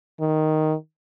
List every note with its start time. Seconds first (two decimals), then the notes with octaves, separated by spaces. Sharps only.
0.20 D#3